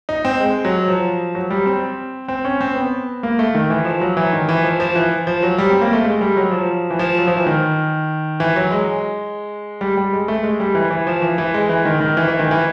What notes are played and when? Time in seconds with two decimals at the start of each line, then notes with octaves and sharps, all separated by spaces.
0.09 D#4
0.25 C4
0.40 G#3
0.65 F#3
0.88 F3
1.35 F#3
1.50 G3
1.66 C4
2.28 C4
2.45 C#4
2.61 C4
2.76 B3
3.23 A#3
3.39 A3
3.55 D#3
3.70 E3
3.85 F3
4.01 F#3
4.17 E3
4.33 D#3
4.49 E3
4.64 F3
4.80 F3
4.96 E3
5.27 F3
5.43 F#3
5.58 G3
5.70 C4
5.81 A#3
5.93 A3
6.05 G#3
6.21 G3
6.37 F#3
6.51 F3
6.90 E3
6.99 F3
7.18 F#3
7.27 F3
7.37 E3
7.47 D#3
8.40 E3
8.56 F#3
8.71 G#3
9.81 G3
9.97 G3
10.13 G#3
10.28 A3
10.43 G#3
10.60 G3
10.75 E3
10.91 E3
11.07 F3
11.22 E3
11.38 E3
11.54 G#3
11.69 E3
11.85 D#3
12.00 D#3
12.17 E3
12.28 E3
12.40 D#3
12.51 E3